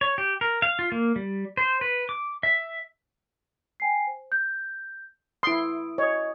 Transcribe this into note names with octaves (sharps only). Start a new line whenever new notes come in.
C#5
G4
A#4
F5
F4
A#3
G3
C5
B4
D6
E5
G5 G#5 C7
C5
G6
E4 C6 D#6 D7
C#5 D#5 D#6